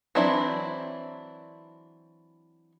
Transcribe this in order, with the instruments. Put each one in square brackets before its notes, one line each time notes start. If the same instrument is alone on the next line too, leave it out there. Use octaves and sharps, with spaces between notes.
[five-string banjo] E3 F#3 C4 D4 E4